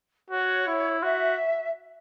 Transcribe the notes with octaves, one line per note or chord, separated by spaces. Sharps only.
F#4 C#5
E4
F#4 E5